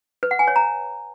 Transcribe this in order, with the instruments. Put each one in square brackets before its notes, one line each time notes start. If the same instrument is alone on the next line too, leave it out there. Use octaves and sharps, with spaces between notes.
[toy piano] B4
F#5
G#5
C#5
A#5